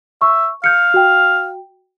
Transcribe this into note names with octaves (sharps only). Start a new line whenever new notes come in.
E5 C#6
F5 G6 C#7
F#4 G5